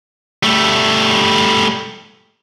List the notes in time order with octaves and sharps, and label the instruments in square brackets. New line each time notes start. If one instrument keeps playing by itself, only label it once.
[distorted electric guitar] G3 A3